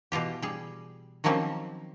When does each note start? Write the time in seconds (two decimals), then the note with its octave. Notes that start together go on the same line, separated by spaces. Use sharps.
0.12 B2 E3 F4 G4
0.42 G3 G#4
1.24 D#3 F3 F#3 A#3 C4 C#4